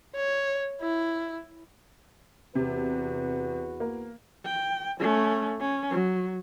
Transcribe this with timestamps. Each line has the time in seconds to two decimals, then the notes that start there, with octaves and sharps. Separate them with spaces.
0.15 C#5
0.81 E4
2.55 E2 C3 F#4 B4
3.80 A#3
4.45 G5
5.00 A3 C#4
5.61 C#4
5.91 F#3